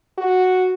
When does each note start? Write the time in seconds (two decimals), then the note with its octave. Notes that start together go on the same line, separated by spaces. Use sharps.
0.18 F#4